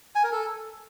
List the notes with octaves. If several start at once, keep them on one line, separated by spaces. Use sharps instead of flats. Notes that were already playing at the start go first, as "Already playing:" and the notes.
G#5
A#4
A4